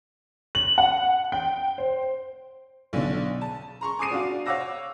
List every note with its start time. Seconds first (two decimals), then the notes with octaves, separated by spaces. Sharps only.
0.55 F#7
0.78 F#5
1.32 G5
1.78 C5
2.93 B1 B2 D3 D4
3.41 A5
3.81 A#5 C6 C#6
3.99 G#5 D6 D#6 C7 D#7
4.11 D4 F#4 F5
4.46 C#5 F5 F#5 D6 E6 A#6